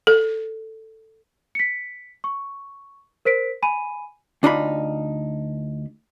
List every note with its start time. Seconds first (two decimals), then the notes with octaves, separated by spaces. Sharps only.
0.07 A4
1.55 B6 C#7
2.24 C#6
3.25 A#4 C5 B6 D7
3.63 G#5 B5 D#7
4.43 D2 D4 D#4 F4 B5